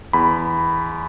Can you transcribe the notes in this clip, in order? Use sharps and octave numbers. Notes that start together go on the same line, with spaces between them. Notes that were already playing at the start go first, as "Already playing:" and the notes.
E2 B5